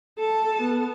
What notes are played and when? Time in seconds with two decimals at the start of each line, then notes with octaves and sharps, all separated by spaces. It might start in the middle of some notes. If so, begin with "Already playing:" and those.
0.18 A4 A5
0.61 B3